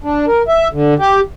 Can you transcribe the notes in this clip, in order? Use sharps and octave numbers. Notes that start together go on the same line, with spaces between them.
D4
A#4
E5
D3
G4